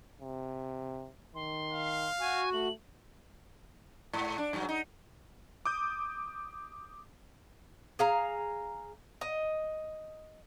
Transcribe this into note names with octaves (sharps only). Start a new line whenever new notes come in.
C3
D#3 C6
F5
F#4 G#5
A3 F#7
G#2
D4
G2 F#3
D#4
D6 D#6 G6
G#4 F5 A#5
D#5